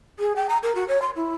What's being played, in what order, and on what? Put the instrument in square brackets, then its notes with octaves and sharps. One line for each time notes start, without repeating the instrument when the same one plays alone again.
[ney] G#4
G5
A#5
A#4
F#4
C#5
C6
E4